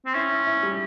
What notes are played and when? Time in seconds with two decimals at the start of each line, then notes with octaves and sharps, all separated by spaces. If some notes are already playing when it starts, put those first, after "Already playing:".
0.06 C4
0.14 C#4 E4
0.31 E4
0.47 E4
0.63 G3